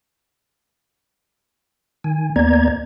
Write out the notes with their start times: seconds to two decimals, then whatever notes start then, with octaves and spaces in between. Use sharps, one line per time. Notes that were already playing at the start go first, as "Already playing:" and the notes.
2.04 D#3 G#5
2.36 D#2 A#3 B3 D5 A#5 G#6